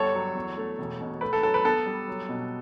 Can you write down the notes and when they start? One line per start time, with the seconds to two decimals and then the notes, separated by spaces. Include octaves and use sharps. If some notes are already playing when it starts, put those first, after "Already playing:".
Already playing: G1 G3 A4 C#5
0.15 F#3
0.35 E2
0.57 A3
0.79 E1
1.01 B2
1.21 A3 B4
1.33 A4
1.43 F#3 A4
1.54 B4
1.65 B3 A4
1.86 G3
2.08 F#3
2.29 B2